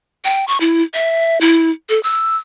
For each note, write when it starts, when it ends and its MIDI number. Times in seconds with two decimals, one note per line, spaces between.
0.25 0.45 79
0.48 0.58 85
0.60 0.83 64
0.94 1.38 76
1.41 1.70 64
1.89 2.01 69
2.03 2.37 88